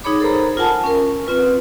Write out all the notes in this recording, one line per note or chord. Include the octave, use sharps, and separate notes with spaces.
D#4 G#4 C#5 B5 D6
A4 A#4 C5 A#5 B5
F4 A#4 F#5 G#5 A5 B5
C#4 A#4
C4 F4 B4